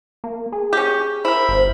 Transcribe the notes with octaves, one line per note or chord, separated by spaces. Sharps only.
A#3
G#4
C#4 G4
E4 A#4 C5 B5
G1